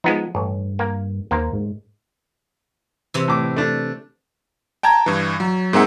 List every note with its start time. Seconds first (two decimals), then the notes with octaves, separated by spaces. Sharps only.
0.04 F3 G#3 B3 D#4
0.35 A1 G2
0.79 A#3
1.31 D#2 A#3 A#4 C5
1.53 G#2
3.14 C3 E3
3.28 A2 D6
3.56 A3 D4
4.83 G5 A5 A#5 G#6
5.06 G2 E3
5.40 F#3
5.73 G#2 A#3 C4 G#4 E5 F#5